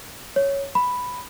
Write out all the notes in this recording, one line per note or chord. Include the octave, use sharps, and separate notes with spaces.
C#5
B5